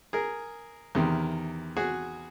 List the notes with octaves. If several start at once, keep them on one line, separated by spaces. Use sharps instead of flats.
G#4 A#4
E2 C3 D#3
F#4 G#4